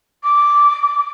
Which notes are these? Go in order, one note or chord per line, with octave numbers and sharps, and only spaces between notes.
D6